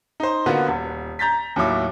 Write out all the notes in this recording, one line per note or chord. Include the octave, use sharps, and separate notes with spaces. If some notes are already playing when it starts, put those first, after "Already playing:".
D#4 C5
D3 A#3 B3 F4 F#4
D#1
A#5 G6 A6 B6
D#2 A2 F#3 E4 D6